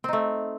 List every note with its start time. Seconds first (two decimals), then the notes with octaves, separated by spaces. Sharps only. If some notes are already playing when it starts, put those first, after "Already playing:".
0.04 C4
0.09 D#4
0.13 A3